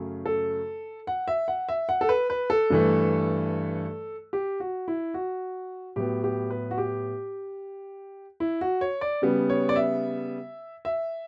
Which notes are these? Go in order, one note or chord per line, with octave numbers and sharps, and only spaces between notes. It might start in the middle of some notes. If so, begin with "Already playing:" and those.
Already playing: F#2 C#3 F#3 A3
A4
F#5
E5
F#5
E5
F#5
A4
B4
B4
A4
G2 E3 A3
G4
F#4
E4
F#4
A2 F#3 B3 G4
G4
B4
F#4
G4
E4
F#4
C#5
D5
C#3 G3 B3
C#5
D5
E5
E5